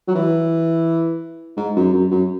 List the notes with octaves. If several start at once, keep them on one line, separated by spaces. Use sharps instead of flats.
F#3
E3
G#2
F#2
F#2
F#2